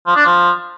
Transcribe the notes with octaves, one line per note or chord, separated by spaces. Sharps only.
F3
D4
F3